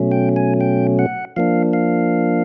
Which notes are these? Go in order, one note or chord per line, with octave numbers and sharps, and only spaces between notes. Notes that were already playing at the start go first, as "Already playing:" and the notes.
Already playing: B2 F#3 A3 C#4
G5
G#5
G5
F#5
F3 A#3 D4 F5
F5